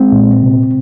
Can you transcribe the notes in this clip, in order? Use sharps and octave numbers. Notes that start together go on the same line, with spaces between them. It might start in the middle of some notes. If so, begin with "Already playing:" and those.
Already playing: G#3 C4
A#2
C3